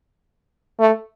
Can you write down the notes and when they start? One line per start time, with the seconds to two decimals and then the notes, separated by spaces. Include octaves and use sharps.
0.80 A3